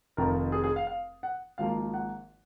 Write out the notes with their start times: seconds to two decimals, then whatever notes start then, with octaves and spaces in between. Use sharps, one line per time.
0.17 F1 F2 D#3 A#4
0.52 G#4
0.64 G#4
0.76 F5
0.87 F5
1.23 F#5
1.58 G#1 G#2 F3 A#3 F5
1.94 F#5